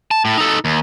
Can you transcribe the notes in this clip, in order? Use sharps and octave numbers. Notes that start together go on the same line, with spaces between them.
A5
A2
D#4 A4
D#2